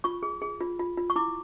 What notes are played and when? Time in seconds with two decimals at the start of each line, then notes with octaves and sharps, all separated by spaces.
0.04 F4 C#6
0.23 G#4
0.42 G#4
0.60 F4
0.79 F4
0.97 F4
1.10 C#6
1.16 E4 D6